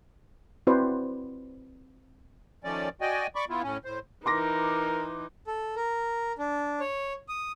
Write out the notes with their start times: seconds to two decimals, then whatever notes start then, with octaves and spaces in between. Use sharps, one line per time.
0.67 C4 E4 F#4 B4 C5 D5
2.64 D#3 F3 A3 C#4 D5
3.01 F#4 D5 D#5 G5 G#5
3.35 D5 B5 C#6 D6
3.49 B3 E4 F4
3.63 A2 C#4
3.85 A2 C5
4.26 E3 D#4 A#4 C6 D6 A#6
5.47 A4
5.76 A#4
6.39 D4
6.80 C#5
7.29 D#6